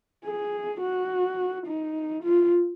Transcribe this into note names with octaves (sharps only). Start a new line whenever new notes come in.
G#4
F#4
D#4
F4